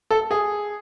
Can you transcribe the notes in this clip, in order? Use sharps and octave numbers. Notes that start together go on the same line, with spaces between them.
A4
G#4